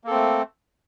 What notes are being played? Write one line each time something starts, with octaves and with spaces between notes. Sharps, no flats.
A3 A#3 C4 A4